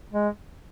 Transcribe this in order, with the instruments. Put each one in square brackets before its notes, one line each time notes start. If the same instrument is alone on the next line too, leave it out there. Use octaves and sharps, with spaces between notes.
[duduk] G#3